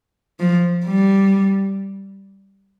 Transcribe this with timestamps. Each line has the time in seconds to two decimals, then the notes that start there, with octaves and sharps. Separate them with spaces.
0.40 F3
0.86 G3